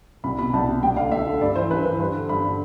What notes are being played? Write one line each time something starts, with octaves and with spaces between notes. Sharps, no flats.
C2 B5
B2 B5
C2 A5
B2
D2 G5
D3 F5
D2 E5
D3
G2 D5
E3 C5
G2 B4
E3 B4
G2 C5
D3
G2 B5
D3